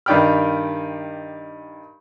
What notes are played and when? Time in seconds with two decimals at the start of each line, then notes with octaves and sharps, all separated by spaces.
0.06 G2 D#3 D5 G5 B5 F6